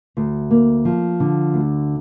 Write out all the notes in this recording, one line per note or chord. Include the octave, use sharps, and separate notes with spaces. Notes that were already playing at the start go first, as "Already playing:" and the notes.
D2
A#3
F3
D3
D2